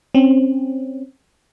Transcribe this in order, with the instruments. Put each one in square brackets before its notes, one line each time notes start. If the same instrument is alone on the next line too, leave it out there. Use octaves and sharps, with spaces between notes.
[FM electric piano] C4 C#4